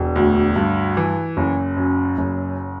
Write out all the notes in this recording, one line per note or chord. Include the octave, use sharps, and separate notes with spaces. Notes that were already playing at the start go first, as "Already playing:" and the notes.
Already playing: E1
D2
G2
E3
F#1
F#2
F#1